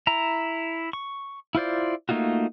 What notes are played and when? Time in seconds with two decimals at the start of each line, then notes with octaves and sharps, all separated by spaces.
0.07 E4 A#5
0.93 C#6
1.55 E4 F4 C5 D5
2.09 A3 A#3 D#4 F4 F#4